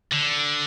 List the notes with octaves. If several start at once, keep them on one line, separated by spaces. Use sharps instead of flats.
D3